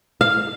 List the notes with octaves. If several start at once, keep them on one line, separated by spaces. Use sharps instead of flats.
F5